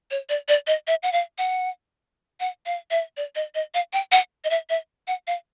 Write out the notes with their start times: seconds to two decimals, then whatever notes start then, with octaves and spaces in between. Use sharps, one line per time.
0.11 C#5
0.29 D5
0.48 D5
0.67 D#5
0.87 E5
1.03 F#5
1.13 F5
1.38 F#5
2.40 F#5
2.66 F5
2.91 E5
3.17 D5
3.35 D#5
3.55 D#5
3.74 F5
3.93 G5
4.12 F#5
4.44 D#5
4.50 E5
4.70 E5
5.08 F#5
5.27 F5